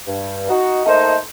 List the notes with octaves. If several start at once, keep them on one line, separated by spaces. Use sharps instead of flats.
G2
D#4 F#4
A3 A#3 D#4 A4 C5 D#5